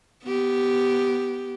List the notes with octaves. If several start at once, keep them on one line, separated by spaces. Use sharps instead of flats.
B3 G4